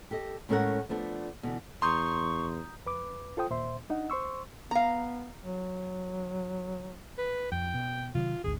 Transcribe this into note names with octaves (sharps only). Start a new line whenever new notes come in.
G4 A4 D#5
A2 G#3 C#4 A4 A#4 F#5
F3 A3 B3 D4
B2 D3 E3
E2 A#5 C6 C#6 D#6 G6
F2 B4 D6
F4 A4 C5 G5 D#6
D#2 A#2 C5 E5 C6
D4 D#4 D#5 F#5
C5 C6 C#6 E6
B3 F5 A#5
F#3
B4
F2 G5
B2
C3 D#3 F#3 F4
G#1 D2 G#4